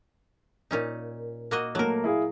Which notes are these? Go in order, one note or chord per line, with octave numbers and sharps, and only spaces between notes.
A#2 C#4 D#4
A#3 F#4 D#5
F#3 A3 A#3 A#4
E4 G#4 F5